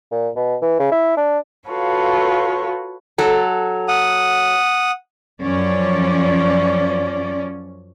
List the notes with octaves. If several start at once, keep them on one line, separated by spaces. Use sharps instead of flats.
A#2
B2
E3
C#3
E4
D4
F4 F#4 A4 B4 C#5 F5
F#3 A4
F#5 D#6
F#2 F3 C#4 D5